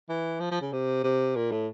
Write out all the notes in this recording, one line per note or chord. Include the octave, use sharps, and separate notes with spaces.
E3
F3
F3
C#3
C3
C3
A#2
A2